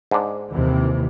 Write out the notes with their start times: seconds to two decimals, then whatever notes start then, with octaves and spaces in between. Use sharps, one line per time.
0.11 G#2 D4
0.51 D#2 C3 E3